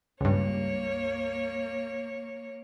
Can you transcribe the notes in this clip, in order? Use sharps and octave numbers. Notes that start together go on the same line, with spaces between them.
C#2 G2 A#3 C#5